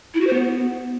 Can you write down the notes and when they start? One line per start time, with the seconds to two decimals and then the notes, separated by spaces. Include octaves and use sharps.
0.14 E4
0.21 F#4
0.27 C5
0.33 B3